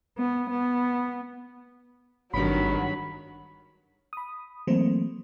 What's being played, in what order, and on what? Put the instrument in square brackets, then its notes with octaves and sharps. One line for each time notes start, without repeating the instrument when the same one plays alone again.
[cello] B3
B3
[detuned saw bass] G#1 [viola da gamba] G2 D#3 [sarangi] F#3 [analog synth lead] B5
[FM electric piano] B5 D#6
E3 F#3 A3 A#3 C4 C5